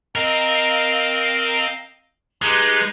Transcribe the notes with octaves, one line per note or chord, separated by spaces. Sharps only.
C4 A#4 D#5 F5
G#3 D#4 G4 B4